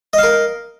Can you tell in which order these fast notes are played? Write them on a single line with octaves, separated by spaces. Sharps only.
D#5 F5 A#4